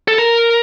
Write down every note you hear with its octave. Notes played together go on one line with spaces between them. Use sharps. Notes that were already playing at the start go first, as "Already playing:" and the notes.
A4
A#4